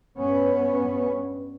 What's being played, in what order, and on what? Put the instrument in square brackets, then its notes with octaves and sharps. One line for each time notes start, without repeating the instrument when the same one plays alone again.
[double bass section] G2 B3 C#4
G2